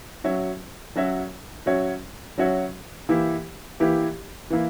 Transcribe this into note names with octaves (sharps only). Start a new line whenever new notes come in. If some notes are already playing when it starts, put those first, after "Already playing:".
F#3 C#4 F#4 C#5 E5
F#3 C#4 F#4 C#5 E5
F#3 C#4 F#4 C#5 E5
F#3 C#4 F#4 C#5 E5
E3 A#3 E4 G4
E3 A#3 E4 G4
E3 A#3 E4